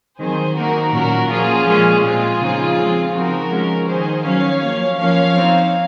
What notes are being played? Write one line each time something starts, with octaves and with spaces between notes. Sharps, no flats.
D#3 F#3 C4 G#4 C5
D#3 A#3 D#4 F#4 A#4
A#2 F#3 C#4 F#4 A#4
F3 A#3 C#4 F4 G#4
A#2 F3 G#3 C#4
A#2 G#3 C4 F4 G#4
C#3 F3 G#3 C4 D#4
F3 G#3 C4
C#3 F3 C4 D#4 F#4 A#4
F3 G#3 C#4
D#3 A#3 D#4 G#4 C5
D#3 F#3 C#4 C#5 F5
F3 A#3 C#4
F3 A#3 C#4 C#5 F5
F3 C4 D#4